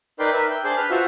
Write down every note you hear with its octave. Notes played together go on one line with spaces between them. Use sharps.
D#4 A#4 B4 D5 G5 C6
A#4 B4 E5
G5
D4 G#4 C5 D5 C6
B4 F6
F4 F#4 C5 E5